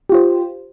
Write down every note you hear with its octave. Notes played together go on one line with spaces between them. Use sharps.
F4 G4 C5